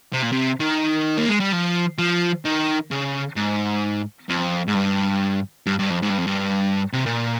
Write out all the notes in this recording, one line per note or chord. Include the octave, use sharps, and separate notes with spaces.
C3
A#2
C3
D#3
A#3
G#3
G3
F3
F3
D#3
C#3
G#2
F2
G#2
G2
G2
G2
F2
G#2
G2
F2
G2
C3
A#2